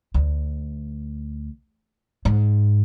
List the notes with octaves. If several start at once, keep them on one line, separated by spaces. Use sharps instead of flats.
D2
G#2